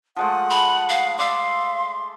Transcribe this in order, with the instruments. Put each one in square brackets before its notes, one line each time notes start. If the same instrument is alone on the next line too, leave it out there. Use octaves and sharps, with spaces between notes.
[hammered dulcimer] F3 G#3 A3 [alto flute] F#5
[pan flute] B5
F5
[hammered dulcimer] D5 E5 [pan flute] F5 [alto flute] C6